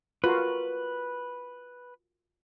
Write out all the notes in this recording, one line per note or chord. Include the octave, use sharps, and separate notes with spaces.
F4 F#4 A#4 B4